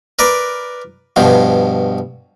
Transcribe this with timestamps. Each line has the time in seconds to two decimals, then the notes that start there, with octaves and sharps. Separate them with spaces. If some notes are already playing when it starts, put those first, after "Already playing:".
0.19 A#4 B4 D5
1.16 G2 B2 F3